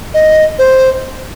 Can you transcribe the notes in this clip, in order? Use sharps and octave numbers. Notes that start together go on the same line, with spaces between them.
D#5
C5